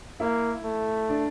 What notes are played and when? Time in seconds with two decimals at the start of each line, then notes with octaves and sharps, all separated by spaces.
0.20 A#3 E4
0.64 A3
1.09 D4